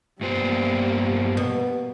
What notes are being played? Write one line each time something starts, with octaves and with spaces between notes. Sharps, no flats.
G2 G3 A#3 B3 C5
B2